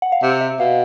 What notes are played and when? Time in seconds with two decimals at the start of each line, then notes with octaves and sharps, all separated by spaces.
0.02 F#5
0.12 F5
0.23 C3 E5
0.41 E5
0.60 B2 F5